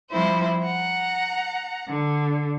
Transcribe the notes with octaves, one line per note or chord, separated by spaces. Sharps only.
F3 G3 C4 E4 C5
F#5 A#5
D3